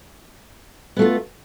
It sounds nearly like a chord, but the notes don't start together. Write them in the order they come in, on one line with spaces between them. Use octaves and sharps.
B3 A3 F4